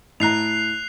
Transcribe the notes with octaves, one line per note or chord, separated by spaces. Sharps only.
A2 A#5 F#6 C7 F7